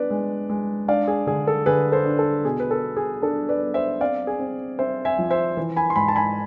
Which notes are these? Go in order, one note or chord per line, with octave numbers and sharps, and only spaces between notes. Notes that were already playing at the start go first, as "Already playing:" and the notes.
Already playing: B3 D4 B4 D5
G#3
G#3
D4 D5 F5
G#4
D3 G#4
A4
D3 G#4 B4
A4 C5
D4
A4
B2 G#4
B4
A4
B3
G#4
D4 A4
B4 D5
B3
C5 E5
C4 D5 F5
G#4
C4
C4 C5 E5
E5 G#5
F3
C5 E5
E3
G#5 B5
C6
G#2 G#5 B5
A5
G#5 B5